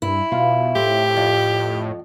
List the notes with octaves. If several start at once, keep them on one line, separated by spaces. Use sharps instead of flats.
G2 E4
B2 F4
A2 C4 G4
F2